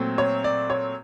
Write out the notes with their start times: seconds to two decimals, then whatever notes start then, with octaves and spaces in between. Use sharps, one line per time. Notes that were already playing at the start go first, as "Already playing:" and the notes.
Already playing: A#2 F#3 A3 C4
0.18 C#5
0.44 D5
0.70 C#5